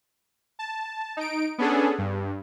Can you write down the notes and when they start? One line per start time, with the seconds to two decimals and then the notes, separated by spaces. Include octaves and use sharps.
0.59 A5
1.17 D#4 D7
1.58 B3 C#4 D4 G#4 A4
1.98 G2